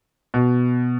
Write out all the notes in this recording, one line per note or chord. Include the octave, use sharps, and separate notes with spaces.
B2